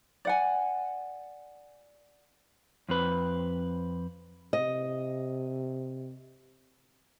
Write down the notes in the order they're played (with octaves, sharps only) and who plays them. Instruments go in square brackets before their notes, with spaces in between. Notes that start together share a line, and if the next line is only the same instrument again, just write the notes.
[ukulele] D5 F#5 G#5
[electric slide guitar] F2 C4 B4
[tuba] C3 [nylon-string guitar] D#5